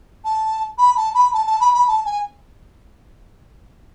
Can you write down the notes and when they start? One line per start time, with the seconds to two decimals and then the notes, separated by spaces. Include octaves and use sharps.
0.24 A5
0.78 B5
0.96 A5
1.14 B5
1.33 A5
1.46 A5
1.60 B5
1.74 B5
1.87 A5
2.05 G#5